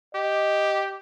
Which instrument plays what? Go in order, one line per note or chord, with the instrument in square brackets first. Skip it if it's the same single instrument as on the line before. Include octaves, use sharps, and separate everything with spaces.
[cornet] G4 [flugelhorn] D#5